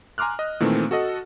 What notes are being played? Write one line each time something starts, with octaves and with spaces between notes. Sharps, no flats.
G#5 A#5 C6 D6 F6 F#6
D#5
A#2 D#3 E3 A3 C4
F#4 A4 D#5 F#5